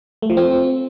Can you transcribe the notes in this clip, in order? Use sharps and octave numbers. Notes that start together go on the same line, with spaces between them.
A3
F3
C4